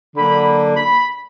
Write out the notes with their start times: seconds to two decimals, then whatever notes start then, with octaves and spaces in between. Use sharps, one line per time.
0.16 D3 F#3 A#3 D4 B5
0.77 B5